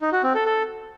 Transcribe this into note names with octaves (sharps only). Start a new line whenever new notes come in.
D#4
F#4
C4
A4
A4